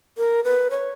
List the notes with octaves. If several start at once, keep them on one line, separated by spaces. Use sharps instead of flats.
A#4
B4
C#5